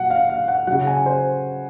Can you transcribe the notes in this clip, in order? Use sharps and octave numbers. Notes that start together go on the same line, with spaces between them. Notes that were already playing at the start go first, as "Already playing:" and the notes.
Already playing: A#2 F#3 F#5
F5
F5
F#5
C#3 F#3 F#5
G#5
C5